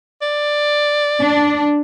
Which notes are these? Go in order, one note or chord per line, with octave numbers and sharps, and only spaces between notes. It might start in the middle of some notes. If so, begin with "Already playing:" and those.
D5
D4